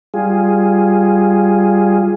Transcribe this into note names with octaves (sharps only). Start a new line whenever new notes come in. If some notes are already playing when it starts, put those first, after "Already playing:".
G3 F4 G#4